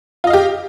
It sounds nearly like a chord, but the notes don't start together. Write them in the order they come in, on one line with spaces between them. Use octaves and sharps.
F4 D#5 F5 G4